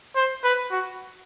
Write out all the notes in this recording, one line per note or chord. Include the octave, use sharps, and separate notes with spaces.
C5
B4
F#4